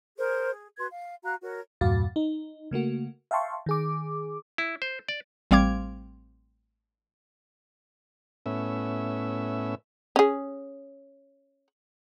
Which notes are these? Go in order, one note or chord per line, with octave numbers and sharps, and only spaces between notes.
G#4 A#4 C5
G#4
F#4 B4 C6 G#6
F5
F#4 F5 A#5 F#6
F#4 A#4 C#5
E2 G2 A#2 F#4 F5 A6
D#4
C#3 A3 A#3 F#4
E5 F5 G5 A5 C6 C#6
D#3 G#4 D6
E4
C5
D5
A1 G3 C4 F5 D6 G#6
A2 B3 C#4 E5
C#4 G#4